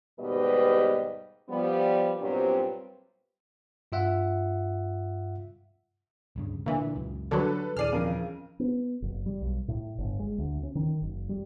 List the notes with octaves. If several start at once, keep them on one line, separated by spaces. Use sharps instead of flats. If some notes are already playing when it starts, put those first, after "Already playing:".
D#2 G#2 B2 G3 B4 D#5
F3 G3 B3
G2 A#2 F#3 B3 C4
G2 F4 E5 F#5
D1 G2 C#3
A#2 D3 E3
C#2 F#2
D3 F#3 G3 A4 B4
D#1 E3 G#4 D5 F6 C7 D#7
F2 C#3 A#4
B3
F#1
G3
B1
A2
G1
G#3
D2
C#4
D#3
F#1
G3